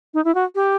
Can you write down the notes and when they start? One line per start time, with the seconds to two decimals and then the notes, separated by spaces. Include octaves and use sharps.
0.14 D#4
0.24 E4
0.35 F#4
0.55 G4